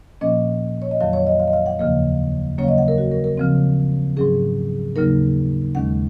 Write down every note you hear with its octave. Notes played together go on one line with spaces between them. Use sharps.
A#2 F3 A#3 C#4 D#5
C#5
D#5
F2 D#3 F#3 F5
C#5
D#5
F5
D#5
F5
F#5
D#2 C#3 F3 A#3 D#5
C#3 F#3 A#3 C#4 C#5
F5
D#5
F#5
A#4
F#4
A#4
A#4
C#3 F3 C4
G#2 F#3 C#4 G#4
D#2 C#3 F#3 A#3 D#4 A#4
D#2 D#3 G#3 C#4 F#5